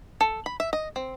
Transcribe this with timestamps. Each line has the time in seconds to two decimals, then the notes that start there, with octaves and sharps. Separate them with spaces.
0.21 A4
0.46 B5
0.60 E5
0.73 D#5
0.96 C4